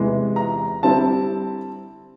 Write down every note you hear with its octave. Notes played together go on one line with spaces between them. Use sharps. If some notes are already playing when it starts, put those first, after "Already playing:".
Already playing: E2 C3 E3 G#3
A#5
D3 G3 C4 E4 A5